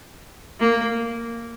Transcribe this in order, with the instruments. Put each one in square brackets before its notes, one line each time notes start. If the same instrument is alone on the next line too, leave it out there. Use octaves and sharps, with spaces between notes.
[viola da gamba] A#3